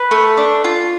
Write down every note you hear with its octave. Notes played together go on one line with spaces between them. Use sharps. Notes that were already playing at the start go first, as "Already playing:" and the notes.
Already playing: B4
A3
D4
F4